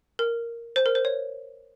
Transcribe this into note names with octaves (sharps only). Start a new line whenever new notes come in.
A#4
C5
A#4
C5
C#5